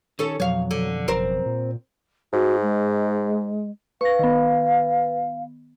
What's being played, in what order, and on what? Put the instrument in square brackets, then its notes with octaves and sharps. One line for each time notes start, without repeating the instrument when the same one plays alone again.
[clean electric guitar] D#3 [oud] C#4 A4
[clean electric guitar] B1 F2 [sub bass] F#3 [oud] C#5 F5
[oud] D3
[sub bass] F#1 [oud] C4 A#4 C5
[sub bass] A#2
[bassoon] G#2 [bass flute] F#4
[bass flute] G#3
[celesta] B4 [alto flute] F5 [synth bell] C#6 A#6
[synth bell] D#3 B3